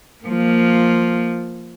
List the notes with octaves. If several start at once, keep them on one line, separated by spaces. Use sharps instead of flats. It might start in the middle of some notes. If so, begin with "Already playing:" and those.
F3 A#3